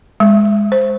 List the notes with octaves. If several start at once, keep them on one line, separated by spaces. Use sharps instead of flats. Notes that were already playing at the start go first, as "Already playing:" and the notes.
G#3
C5